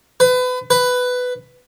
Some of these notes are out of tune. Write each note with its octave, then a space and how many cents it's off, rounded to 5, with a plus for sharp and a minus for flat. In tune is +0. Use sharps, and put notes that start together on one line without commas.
B4 +30
B4 +10